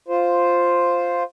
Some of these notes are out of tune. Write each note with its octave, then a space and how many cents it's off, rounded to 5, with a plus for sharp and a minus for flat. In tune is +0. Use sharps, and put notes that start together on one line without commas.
F4 +0 C5 +0